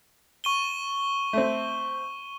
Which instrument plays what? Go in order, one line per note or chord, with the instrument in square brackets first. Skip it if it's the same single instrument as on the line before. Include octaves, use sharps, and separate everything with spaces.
[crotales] C#6 D#7 G7
[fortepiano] A3 C4